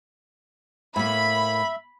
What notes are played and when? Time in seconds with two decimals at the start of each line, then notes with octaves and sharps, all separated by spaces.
0.96 A2 A#3 E5 B5